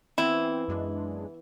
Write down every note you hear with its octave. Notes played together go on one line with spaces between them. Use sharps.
E3 B3 C4 E4 G#5
F#2 G#3 D4